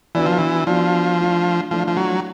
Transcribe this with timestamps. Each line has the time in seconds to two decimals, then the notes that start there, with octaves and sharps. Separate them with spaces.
0.15 E3 B3 D4 F#4 B4 D5
0.26 F3
0.38 E3
0.67 F3 B3 D4 F#4 B4 D5
1.19 E3 A3 D4 F4
1.71 E3 F3 A3 D4 F4
1.87 F3
1.97 F#3